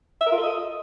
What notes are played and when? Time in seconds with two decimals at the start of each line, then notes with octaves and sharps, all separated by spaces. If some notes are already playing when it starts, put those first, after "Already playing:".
0.21 E5
0.26 A#4
0.32 F4
0.37 A4
0.43 D#5